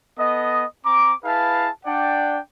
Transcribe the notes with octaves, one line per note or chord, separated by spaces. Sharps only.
B3 A4 D#5
C4 A#5 D6
E4 G#4 B4 F5 A5
D4 D5 F#5 G5